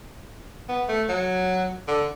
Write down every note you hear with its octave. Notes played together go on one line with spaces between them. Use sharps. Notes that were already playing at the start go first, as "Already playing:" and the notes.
B3
A3
F#3
D3